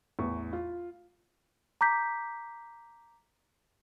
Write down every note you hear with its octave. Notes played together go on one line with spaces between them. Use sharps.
A1 E2 E3 C#6
F4
A#5 D6 G6 B6